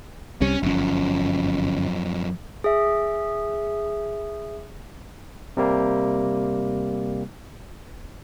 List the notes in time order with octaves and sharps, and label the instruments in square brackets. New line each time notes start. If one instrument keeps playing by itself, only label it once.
[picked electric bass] C2 C3 G3 [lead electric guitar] C#4
[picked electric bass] G1 C#4 [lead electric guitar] F#2 F3
[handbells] G#4 E5
[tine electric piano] C3 G3 A#3